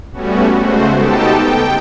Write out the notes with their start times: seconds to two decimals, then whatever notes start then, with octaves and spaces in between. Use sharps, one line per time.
0.12 G3 A3 B3 C#4 F#4
0.59 C#3 G#3 A3 F#4 C5
0.96 B3 D#4 G4 A4 G5 A5
1.41 G5